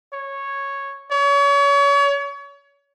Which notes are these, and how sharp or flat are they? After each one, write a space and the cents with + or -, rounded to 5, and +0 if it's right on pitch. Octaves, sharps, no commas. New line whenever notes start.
C#5 -5
C#5 +35